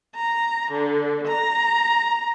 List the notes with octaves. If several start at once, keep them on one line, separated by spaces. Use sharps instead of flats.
A#5
D3
A#5